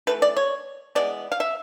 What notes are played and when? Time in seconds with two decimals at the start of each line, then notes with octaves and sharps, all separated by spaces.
0.07 E3 A3 B4
0.22 D5
0.37 C#5
0.95 E3 G#3 B3 D5
1.32 F5
1.40 E5